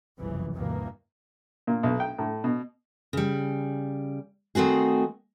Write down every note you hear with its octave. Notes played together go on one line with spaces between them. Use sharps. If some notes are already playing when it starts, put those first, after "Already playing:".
F1 C2 F#2 C#3 E3
D2 G2 B2 D#3 E3 A#3
A#2
B1
G5
A2
B2
C#3 G3
D#3 A3 C4 F#4 G#4